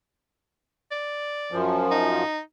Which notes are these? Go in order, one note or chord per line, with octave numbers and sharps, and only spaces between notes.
D5
F#2 F3
D#4